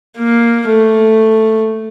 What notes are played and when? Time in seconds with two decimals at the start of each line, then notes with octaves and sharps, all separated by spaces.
0.18 A#3
0.69 A3